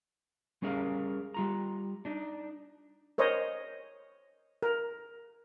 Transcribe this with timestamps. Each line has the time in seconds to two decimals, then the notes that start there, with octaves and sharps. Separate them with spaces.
0.62 G3 C#4 G#4 A#4 F5
1.34 G3 F4 A#5
2.05 D4 D#4
3.18 A#4 C5 C#5 D#5
4.63 A#4